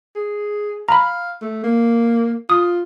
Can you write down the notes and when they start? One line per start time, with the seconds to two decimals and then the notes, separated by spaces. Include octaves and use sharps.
0.16 G#4
0.89 F5 A#5 B5
1.42 A3
1.64 A#3
2.50 F4 D#6